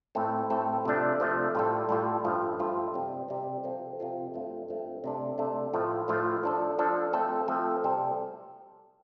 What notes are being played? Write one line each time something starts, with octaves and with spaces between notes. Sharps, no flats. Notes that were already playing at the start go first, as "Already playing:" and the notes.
A2 A3 C4 A4
A2 A3 C4 A4
C3 F3 A3 D4
C3 F3 A3 D4
A2 G3 F4 A4
A2 G3 F4 A4
G2 F3 A3 F4
G2 F3 A3 F4
C3 G3 C4
C3 G3 C4
C3 F3 C4 F4 A4
C3 F3 C4 F4 A4
G2 F3 A3 C4
G2 F3 A3 C4
C3 A3 D4
C3 A3 D4
A2 F3 A3 F4
A2 F3 A3 F4
F3 D4 A4
F3 D4 A4
F3 A3 C4 A4
F3 A3 C4 A4
C3 G3 C4 A4